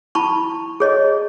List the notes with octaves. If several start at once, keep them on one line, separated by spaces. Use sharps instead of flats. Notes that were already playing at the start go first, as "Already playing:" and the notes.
E4 A5 B5 C#6
G#4 C#5 D#5